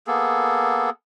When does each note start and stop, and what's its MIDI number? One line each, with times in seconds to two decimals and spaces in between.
0.07 0.90 58
0.07 0.90 59
0.07 0.90 68
0.07 0.90 69